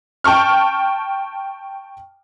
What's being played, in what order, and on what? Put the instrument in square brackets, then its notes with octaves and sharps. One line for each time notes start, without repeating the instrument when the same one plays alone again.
[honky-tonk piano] G5 A5 C#6 F6